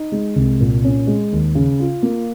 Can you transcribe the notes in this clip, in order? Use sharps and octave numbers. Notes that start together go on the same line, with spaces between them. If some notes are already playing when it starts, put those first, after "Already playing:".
Already playing: D#4
G#3
C2
A#2
C#4
G#3
D#2
C#3
F4
A#3